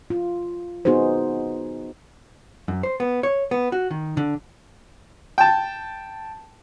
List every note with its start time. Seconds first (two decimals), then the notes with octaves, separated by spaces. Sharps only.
0.10 F4
0.85 B3 D#4 F#4 G#4 C5
2.68 F#2
2.83 C5
3.00 B3
3.23 C#5
3.51 B3
3.72 F#4
3.91 D#3
4.17 D3
5.38 G5 A5